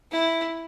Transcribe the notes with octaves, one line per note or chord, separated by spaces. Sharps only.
E4